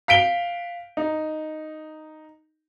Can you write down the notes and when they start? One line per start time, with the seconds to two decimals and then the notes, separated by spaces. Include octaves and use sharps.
0.08 F5 B6 D7 G7
0.97 D#4